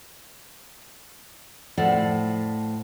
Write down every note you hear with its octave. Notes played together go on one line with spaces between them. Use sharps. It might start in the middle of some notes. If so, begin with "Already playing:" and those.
A2 F3 A4 D5 F#5